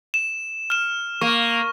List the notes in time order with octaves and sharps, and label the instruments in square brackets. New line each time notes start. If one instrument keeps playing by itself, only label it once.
[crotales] E7
F6 E7
[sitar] A#3 [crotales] C#6